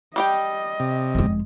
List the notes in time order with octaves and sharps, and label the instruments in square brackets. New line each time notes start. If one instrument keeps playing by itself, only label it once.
[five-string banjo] G3 G4 G5 [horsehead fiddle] D#5
[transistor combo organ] C3
[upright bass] F1 G#3